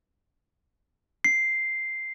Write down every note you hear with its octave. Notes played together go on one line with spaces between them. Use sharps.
C7